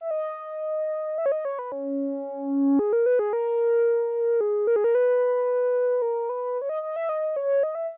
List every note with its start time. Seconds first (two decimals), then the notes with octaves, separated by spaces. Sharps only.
0.01 E5
0.11 D#5
1.18 E5
1.26 C#5
1.32 D#5
1.45 C#5
1.59 B4
1.72 C#4
2.79 G#4
2.93 A#4
3.06 B4
3.19 G#4
3.33 A#4
4.41 G#4
4.67 A#4
4.76 G#4
4.84 A#4
4.95 B4
6.02 A#4
6.29 B4
6.62 C#5
6.69 D#5
6.83 D#5
6.96 E5
7.09 D#5
7.36 C#5
7.63 D#5
7.75 E5